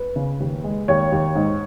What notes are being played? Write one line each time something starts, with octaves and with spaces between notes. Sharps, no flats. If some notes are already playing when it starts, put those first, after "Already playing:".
Already playing: B4
C#3
D#2
G#3
D#2 C#5
D#2
G#2